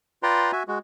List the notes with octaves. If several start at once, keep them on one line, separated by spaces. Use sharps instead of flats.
F4 B4 D5 G5 A#5 C6
F#4 E5 G#5
G#3 F#4